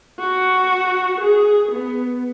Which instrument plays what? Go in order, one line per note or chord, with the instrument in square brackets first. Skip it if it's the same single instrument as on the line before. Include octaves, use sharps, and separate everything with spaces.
[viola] F#4
G#4
B3